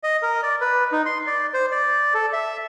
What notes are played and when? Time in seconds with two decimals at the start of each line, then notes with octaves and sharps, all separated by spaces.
0.03 D#5
0.22 A#4
0.43 D5
0.61 B4
0.92 D#4
1.06 C6
1.27 D5
1.54 C5
1.72 D5
2.14 A4
2.33 E5